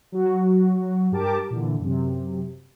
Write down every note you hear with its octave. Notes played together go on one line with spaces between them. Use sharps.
F#3 F#4
G2 G4 A#4 A5 D6
A#2 D3 E3
F#2 C3